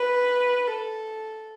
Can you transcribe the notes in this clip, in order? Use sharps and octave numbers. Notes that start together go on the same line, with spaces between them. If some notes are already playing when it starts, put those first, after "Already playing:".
Already playing: B4
A4